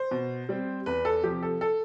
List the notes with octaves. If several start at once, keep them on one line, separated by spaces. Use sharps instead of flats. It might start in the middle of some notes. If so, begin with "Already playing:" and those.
Already playing: C5
B2
G3 C4
E2 B4
A4
C3 F3 G4
A4
A4